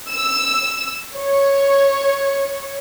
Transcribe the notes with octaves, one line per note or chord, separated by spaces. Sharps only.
E6
C#5